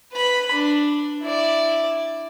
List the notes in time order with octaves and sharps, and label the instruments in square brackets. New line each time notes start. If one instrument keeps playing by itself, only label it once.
[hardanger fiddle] B4 B5
D4
E4 D5